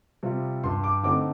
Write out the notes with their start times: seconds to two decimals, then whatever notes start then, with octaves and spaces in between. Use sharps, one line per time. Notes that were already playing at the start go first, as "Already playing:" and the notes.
0.23 C3 G3 C4 F4
0.64 G2 C6
0.84 D6
1.03 D3 A3 C4 D#4 D6